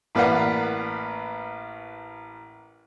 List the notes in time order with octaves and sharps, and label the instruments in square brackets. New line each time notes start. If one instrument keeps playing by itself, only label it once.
[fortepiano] A1 A#3 B4 D5 F5 F#5